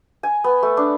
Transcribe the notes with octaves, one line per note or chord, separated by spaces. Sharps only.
G#5
B3
A3
D4